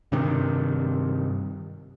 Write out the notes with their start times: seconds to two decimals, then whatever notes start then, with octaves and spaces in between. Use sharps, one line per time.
0.12 G2 C3 D#3